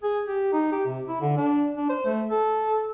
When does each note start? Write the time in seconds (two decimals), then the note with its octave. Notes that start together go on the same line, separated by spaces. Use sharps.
0.03 G#4
0.27 G4
0.53 D#4
0.72 G4
0.86 C3
1.08 E4
1.21 D3
1.38 D4
1.78 D4
1.89 C5
2.06 A3
2.31 A4